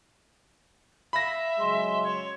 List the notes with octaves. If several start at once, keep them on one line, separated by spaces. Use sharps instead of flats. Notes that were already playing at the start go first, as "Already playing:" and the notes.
E5 F5 B5 A#6
C#3 F#3 G#3 C6
C#5